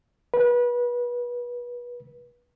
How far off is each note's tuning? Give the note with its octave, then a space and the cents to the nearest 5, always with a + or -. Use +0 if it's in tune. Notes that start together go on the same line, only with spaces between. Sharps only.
B4 -30